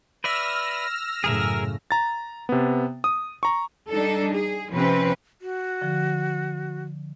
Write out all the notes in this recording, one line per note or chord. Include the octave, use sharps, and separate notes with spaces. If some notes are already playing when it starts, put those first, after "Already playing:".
B4 D5 E5 E6 F6 A#6
F#2 A2 C#3 G#4 A#4 E5
A#5 A6
C3 B3
D#6
A#5 C#6
G3 D4 D#4 A4
G#4
C3 F3 C4 C#4 B4
F#4
D3 F3